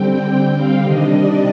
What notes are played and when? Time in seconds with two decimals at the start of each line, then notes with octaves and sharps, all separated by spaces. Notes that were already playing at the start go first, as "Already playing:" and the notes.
Already playing: D3 G3 C4 G5
0.54 F5
0.83 C3 D#3 G3 D4 D#5
1.12 D5